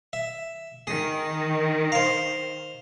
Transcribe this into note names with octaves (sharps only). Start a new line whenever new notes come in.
E5
D#3 G#4
C5 F5